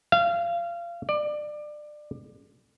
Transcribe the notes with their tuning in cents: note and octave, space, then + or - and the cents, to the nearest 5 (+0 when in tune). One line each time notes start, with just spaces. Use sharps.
F5 -25
D5 +25